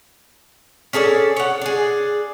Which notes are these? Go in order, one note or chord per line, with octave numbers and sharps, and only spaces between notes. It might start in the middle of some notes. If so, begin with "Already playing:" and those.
C#4 G#4 A4 D5
C#5 F#5
D4 G#4